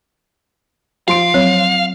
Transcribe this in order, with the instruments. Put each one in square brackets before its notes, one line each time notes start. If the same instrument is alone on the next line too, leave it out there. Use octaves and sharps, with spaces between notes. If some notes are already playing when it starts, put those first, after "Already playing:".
[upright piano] F3 C6 D7 [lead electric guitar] F5
[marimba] F#3 C4 C#5